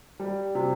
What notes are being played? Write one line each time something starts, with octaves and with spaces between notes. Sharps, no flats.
G3
C3